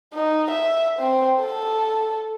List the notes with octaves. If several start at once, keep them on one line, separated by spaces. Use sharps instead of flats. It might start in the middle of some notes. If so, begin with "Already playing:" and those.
D#4
E5
C4
A4